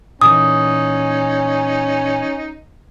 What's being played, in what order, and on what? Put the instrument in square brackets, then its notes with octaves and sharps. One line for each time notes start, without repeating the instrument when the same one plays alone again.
[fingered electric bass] A#2 E3 [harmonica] C#4 D#4 [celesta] D#6